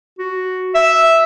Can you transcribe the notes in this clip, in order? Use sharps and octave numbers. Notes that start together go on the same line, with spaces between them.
F#4
E5